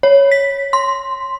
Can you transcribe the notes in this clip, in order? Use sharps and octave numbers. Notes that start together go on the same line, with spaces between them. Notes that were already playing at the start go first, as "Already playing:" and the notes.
C#5
B6
C6